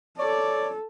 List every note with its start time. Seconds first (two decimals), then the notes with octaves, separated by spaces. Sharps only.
0.18 A4 C#5 D5